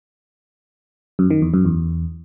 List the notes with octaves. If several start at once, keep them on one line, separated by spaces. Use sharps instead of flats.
F#2
D#3
E2
F#2
E2